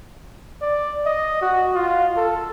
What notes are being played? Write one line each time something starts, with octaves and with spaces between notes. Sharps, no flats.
D5
D#5
F#4
F4
A4